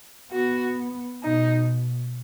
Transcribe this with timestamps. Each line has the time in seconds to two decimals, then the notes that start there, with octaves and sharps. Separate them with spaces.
0.32 B3 F#4
1.23 B2 D#4